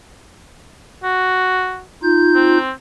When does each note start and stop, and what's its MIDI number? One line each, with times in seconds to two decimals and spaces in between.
1.03 1.83 66
2.03 2.58 63
2.03 2.58 65
2.03 2.58 91
2.35 2.72 60